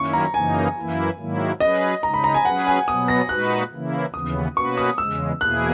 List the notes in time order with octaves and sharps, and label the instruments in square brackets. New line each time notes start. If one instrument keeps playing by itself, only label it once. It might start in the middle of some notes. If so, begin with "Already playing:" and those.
Already playing: [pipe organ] F#2 D#3 A#3 C#4 E4 [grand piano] C#6
[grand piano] A#5
[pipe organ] F#2 C#3 E3 A#3 D#4 [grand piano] G#5
[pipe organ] F#2 E3 A#3 E4
G#2 D#3 F#3 A#3 E4
[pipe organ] F#3 C#4 G#4 B4 [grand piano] D#5
[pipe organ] C#3 G#3 D#4 [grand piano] A#5
[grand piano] B5
A#5
G#5
[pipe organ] F#3 C#4 G#4 B4 [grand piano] F#5
[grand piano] G#5
[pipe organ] B2 F#3 B3 [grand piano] D#6
[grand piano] A#6
[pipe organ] A#2 G#3 D#4 F#4 B4 [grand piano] F#6
[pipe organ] C#3 E3 A#3 E4
[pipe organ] D#2 C#3 E3 B3 [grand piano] D#6
[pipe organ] B2 A#3 C#4 F#4 B4 [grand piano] C#6
[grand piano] D#6
[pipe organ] E2 C#3 G#3 [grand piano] E6
[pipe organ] E2 B2 A#3 E4 G#4 [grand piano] F#6